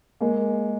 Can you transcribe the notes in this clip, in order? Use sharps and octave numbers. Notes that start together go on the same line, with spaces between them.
G#3 A#3